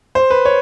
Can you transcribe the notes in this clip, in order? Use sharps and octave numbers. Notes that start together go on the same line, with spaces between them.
C5
B4
C#5